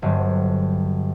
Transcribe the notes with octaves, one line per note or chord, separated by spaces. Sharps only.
G1 G2 F#3 C4